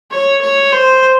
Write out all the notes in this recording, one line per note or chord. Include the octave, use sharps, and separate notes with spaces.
C#5
C#5
C5